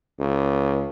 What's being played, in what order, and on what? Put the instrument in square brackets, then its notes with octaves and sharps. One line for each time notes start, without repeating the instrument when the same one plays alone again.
[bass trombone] C#2